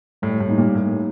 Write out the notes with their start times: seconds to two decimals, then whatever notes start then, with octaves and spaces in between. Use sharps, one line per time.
0.22 A2 G3
0.40 A2
0.49 A#3 D#4 G4
0.58 A#2
0.75 A2 G3